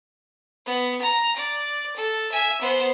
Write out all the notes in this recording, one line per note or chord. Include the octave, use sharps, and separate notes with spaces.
B3
A#5
D5
A4
E5 G#5
B3 C5